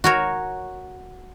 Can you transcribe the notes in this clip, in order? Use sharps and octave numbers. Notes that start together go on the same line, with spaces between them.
F#4 A#4 C#5